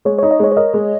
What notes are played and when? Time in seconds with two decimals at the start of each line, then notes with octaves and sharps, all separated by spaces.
0.05 G#3 C#5
0.19 C#5
0.23 D#4
0.31 D#5
0.40 G#3 C#5
0.52 C#5
0.57 A#4 D#5
0.74 G#3